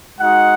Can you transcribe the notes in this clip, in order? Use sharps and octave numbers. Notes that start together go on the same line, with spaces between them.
G#3 D#4 F#4 F#5